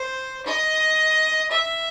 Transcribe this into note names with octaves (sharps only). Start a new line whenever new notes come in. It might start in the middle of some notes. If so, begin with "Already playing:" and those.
Already playing: C5
D#5
E5